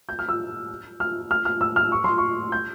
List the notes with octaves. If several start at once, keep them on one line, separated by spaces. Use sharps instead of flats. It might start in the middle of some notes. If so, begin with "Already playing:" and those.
G6
F6
E6
F6
F6
F6
E6
F6
C#6
C6
C#6
G6